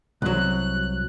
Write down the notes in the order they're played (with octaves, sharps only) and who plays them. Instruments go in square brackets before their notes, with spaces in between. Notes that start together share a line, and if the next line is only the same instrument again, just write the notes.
[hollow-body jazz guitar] C2 F#3 [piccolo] F#6